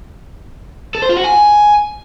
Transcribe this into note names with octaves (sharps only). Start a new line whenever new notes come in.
A4
C5
F4
F#4
G#5